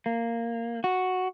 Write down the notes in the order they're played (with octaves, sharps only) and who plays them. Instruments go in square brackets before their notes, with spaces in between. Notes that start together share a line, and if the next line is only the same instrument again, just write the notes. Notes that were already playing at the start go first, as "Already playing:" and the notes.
[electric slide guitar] A#3
F#4